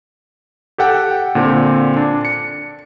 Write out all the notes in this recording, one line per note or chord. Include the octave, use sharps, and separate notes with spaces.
G4 A4 F#5 G5
A#2 D3 C4
D4
C#7